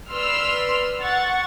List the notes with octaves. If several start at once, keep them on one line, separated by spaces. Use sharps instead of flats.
B4 D5 C6 E6 F6
F#5 C#6 A6